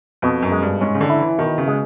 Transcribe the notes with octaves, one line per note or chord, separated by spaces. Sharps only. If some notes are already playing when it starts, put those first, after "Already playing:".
F2 B2
F#2
G#3
G2
G#2 C#4
C#3
D3
E4
E3
B2 D#3
C#3
G#3